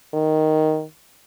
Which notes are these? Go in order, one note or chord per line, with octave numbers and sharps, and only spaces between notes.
D#3